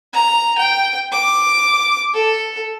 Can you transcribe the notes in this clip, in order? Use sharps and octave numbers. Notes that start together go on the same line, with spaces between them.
A#5
G5
D6
A4